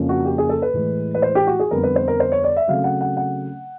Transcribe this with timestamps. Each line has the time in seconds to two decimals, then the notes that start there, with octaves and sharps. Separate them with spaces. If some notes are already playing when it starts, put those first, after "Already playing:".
Already playing: F2 C#3 F3 A#3 C#4
0.09 F#4
0.25 G4
0.38 G#4
0.49 A4
0.62 B4
0.74 A2 E3 G#3
1.15 B4
1.22 C5
1.35 G4
1.47 F#4
1.59 G#4
1.71 F2 D3 G3 B3 A#4
1.83 B4
1.96 C5
2.08 A#4
2.20 C5
2.32 C#5
2.44 D5
2.56 E5
2.68 C#3 F#3 A3 C4 F5
2.84 F#5
3.01 F#5
3.17 F#5